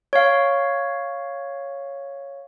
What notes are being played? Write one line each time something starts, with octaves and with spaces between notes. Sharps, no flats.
C#5 F5